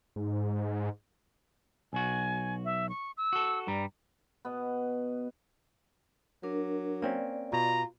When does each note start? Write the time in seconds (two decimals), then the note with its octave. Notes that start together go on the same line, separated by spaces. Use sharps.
0.16 G#2
1.93 B1 F#4 G#5
2.65 E5
2.89 C#6
3.17 E6
3.33 F#4 A4
3.67 G2 G3 A#5
4.45 B2 B3
6.43 F#3 D4 A#4
7.02 A#3 C4 C#4 D5
7.53 B2 F4 A#5